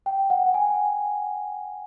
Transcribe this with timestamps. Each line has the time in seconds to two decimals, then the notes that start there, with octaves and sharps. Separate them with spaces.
0.06 G5
0.30 F#5
0.54 G#5